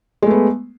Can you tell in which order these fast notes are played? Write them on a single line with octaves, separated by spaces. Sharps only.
G#3 A3 B3